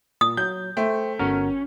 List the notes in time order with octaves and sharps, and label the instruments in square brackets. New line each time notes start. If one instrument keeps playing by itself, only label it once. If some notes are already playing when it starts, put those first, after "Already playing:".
[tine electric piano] A#2 [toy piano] D#6
[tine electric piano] F#3 [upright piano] G6
[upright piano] A3 [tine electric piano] C5 G5
[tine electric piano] G1 F#4 A#4 [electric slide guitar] C#4